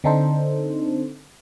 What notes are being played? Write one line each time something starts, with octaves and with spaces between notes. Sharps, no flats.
D3 C4 D4 D#4 A4 C5